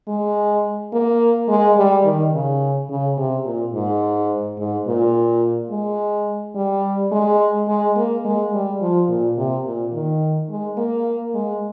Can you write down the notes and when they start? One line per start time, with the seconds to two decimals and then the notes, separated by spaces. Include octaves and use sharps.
0.08 G#3
0.93 A#3
1.49 G#3
1.77 G3
2.05 D#3
2.33 C#3
2.90 C#3
3.18 C3
3.46 A#2
3.73 G#2
4.59 G#2
4.87 A#2
5.71 G#3
6.56 G3
7.12 G#3
7.68 G#3
7.97 A#3
8.25 G#3
8.53 G3
8.81 F3
9.09 A#2
9.38 C3
9.65 A#2
9.94 D#3
10.50 G#3
10.78 A#3
11.35 G#3